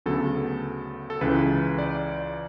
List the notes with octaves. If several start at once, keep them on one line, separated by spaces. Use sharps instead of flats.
D2 C#3 F#3 B3 A4
A4
C#2 C#3 E3 B4
D5